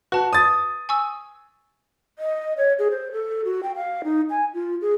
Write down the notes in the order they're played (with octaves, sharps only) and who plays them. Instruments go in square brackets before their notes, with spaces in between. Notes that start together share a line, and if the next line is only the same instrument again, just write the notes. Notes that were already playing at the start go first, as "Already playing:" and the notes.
[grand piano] F#4 [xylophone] B4 A5
[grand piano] D#6 A6
[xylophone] G#5 C#6 E6
[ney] D#5
C#5
G#4
C5
A4
F#4
G5
F5
D#4
G#5
F4
G#4